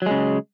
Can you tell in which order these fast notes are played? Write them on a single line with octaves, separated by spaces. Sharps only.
F#3 G#3 C#3